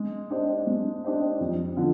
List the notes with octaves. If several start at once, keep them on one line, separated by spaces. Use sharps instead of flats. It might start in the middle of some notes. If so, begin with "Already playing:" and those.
Already playing: G#3
D4 G4 C5 D#5
G#3
D4 G4 C5 D#5
F2
D3 F3